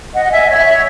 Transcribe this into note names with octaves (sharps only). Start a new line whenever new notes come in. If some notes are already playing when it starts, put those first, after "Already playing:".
D#5 F#5
F#5
E5 G#5
C#5 E5
C#5 E5